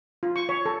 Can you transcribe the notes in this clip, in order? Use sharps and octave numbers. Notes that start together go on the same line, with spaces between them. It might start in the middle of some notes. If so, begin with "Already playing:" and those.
F4
C#6
C#5
A4